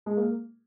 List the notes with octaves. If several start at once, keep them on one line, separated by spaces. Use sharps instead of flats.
G#3
A#3